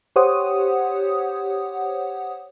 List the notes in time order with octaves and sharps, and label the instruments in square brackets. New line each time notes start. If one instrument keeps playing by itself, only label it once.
[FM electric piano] G4 C5 C#5 F#5 D#6